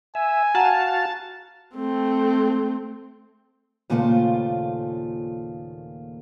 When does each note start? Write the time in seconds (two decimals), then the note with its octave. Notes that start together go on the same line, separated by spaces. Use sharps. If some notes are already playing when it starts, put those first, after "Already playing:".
0.15 E5 G#5
0.55 F#4 F5 F#5 A5 A#5
1.76 A3 C4
3.90 D#2 A#2 C#3 A3 F4 C5